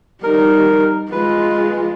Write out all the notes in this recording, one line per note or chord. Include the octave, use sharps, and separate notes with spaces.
G3 D#4 A#4
G#3 F4 B4